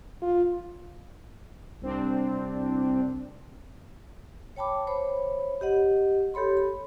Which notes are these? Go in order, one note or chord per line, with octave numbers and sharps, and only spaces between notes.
F4
C2 C4 D4
C#5 G5 A5 B5 D6
C5 C#5 B5
G4 D#5 F#5
G4 A4 C#5 B5 C6
B5